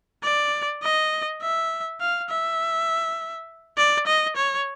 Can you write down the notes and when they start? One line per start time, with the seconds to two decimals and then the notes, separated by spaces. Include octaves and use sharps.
0.23 D5
0.83 D#5
1.42 E5
2.01 F5
2.30 E5
3.77 D5
4.07 D#5
4.36 C#5